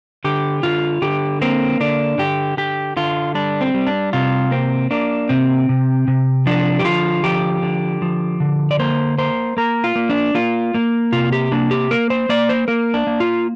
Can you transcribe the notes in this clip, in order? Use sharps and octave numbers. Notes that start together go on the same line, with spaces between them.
D3 G4
D3 F4
D3 G4
A#3 C4
D3 D4
D3 G4
D3 G4
D3 F4
G3 D4
C4
G3
D4
C3 F4
A#3 C4
A#3 D4
C3 C4
C3
C3
F3 D4
G4
D3 F4
F3 G4
D3
F3
D3
D5
A#3 C5
A#3 C5
A#3 A#4
F4
A#3
D4
A#3 F4
A#3
C3 F4
G4
A#3 D4
G4
A#3 A#4
C5
A#3 D5
C5
A#3 A#4
D4
A#3
F4